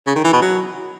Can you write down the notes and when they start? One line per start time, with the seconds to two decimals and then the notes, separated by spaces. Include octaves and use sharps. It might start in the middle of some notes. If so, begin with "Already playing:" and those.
0.07 C#3
0.16 D#3
0.24 E3
0.33 B2
0.42 F#3